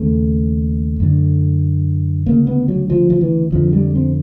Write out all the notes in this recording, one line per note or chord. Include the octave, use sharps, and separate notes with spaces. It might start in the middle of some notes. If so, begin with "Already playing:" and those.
Already playing: D#2 C#3 A3
F#2 D3
D2 C#3 A#3
B3
F#3
F3
F3
E3
F2 D3 F3
G3
C4